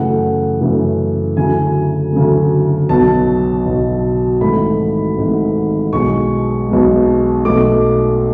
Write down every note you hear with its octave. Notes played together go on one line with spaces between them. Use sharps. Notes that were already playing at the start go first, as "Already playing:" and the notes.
Already playing: F#2 C#3 E3 A3 F#5
F#2 C#3 E3 A3
D2 C#3 F#3 A3 G#5
D2 C#3 F#3 A3
B1 B2 F#3 A5
B1 B2 F#3
G#1 G#2 E3 A3 B5
G#1 G#2 E3 A3
B1 B2 G#3 C#6
B1 B2 G#3
B1 B2 A3 D6